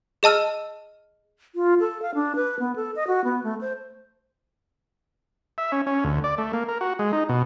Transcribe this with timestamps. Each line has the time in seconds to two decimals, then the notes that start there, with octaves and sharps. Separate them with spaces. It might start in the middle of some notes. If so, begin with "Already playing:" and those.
0.23 G#4 D#5 A5 E6 F6
1.55 F4
1.80 A4
2.02 F5
2.15 D4
2.36 B4
2.60 B3
2.76 A4
2.96 D#5
3.07 F#4
3.24 B3
3.44 A3
3.61 C5
5.58 E5
5.72 C#4
5.87 C#4
6.04 D2
6.24 D5
6.38 A3
6.53 A#3
6.68 A#4
6.81 F#4
6.99 G#3
7.13 D#4
7.29 B2